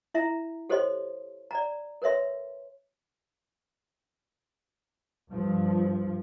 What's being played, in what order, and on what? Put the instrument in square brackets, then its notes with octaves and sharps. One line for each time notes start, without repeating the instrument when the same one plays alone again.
[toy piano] E4 E5 A#5
G4 A4 C5 C#5 D#5 C6
D5 A#5
A#4 B4 C#5 E5 C6
[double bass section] G2 F3